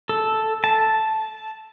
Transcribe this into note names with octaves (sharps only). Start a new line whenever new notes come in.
A4
A5